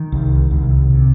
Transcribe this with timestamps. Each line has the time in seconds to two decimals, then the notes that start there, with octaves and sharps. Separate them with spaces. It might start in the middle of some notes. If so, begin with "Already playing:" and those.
Already playing: D#3
0.12 C2
0.51 C2
0.89 C3